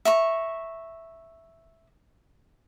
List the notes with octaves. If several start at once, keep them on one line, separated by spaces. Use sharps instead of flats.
E5 A#5 C#6